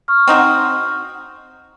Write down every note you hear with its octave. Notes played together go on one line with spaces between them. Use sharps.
C#6 F6
C4 D#4 F#4